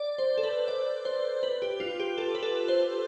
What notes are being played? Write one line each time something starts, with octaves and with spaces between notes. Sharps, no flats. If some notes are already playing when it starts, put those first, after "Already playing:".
Already playing: D5
C5
A4
B4
D5
C5
B4
G4
F4
G4
A4
B4
A4
C5